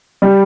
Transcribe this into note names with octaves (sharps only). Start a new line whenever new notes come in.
G3